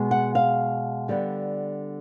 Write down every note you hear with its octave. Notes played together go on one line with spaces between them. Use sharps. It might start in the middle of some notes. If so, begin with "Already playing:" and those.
Already playing: B2 G#3 B3
F#5
F5
D3 G3 B3